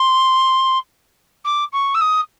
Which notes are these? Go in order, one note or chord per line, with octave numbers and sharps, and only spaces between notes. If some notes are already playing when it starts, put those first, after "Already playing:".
Already playing: C6
D6
C#6
E6
D#6